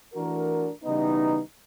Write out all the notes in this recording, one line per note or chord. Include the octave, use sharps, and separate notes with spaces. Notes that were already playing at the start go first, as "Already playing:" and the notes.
E3 A3 D4 F#4 A#4
C#3 E3 G3 B3 D#4